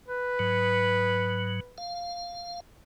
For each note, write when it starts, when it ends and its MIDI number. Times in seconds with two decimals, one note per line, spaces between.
0.08 1.77 71
0.39 1.60 44
0.39 1.60 54
1.78 2.60 77